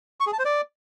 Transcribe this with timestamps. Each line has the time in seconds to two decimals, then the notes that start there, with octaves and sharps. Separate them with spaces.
0.20 C#6
0.27 G#4
0.33 A5
0.39 C5
0.45 D5